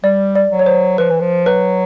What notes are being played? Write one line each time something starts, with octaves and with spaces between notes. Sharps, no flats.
G3 D5
D5
F#3
C#5
C5
F3 B4
E3
F3
F#3 B4